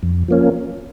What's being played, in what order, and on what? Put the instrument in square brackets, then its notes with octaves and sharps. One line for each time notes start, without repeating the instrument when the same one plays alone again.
[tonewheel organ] F2
F3 A#3 C#4